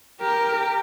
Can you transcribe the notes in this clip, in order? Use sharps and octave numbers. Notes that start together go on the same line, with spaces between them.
G4 A#4